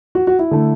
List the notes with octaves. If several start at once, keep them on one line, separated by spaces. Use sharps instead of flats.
F#4
F#4
E4
D3 A3